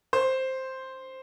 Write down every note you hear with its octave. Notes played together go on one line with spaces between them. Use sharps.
C5